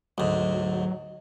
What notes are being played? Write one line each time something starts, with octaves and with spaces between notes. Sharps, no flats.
D2 G#2 F#3